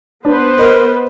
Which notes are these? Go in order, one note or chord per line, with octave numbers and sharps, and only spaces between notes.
B3 D4 B4 C5
A#4 D#5